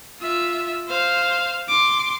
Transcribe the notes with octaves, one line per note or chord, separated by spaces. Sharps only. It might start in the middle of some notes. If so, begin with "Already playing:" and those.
F4 E5
C5 F5
C6 D6